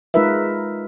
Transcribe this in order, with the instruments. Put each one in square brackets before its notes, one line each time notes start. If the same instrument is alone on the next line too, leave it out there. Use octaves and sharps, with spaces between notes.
[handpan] G#3 D#4 F4 A#4 B4 E5